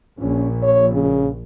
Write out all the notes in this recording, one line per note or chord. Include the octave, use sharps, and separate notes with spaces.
A#1 C#4
C#5
C#3